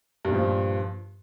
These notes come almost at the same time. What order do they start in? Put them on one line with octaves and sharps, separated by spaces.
G2 A#2 F3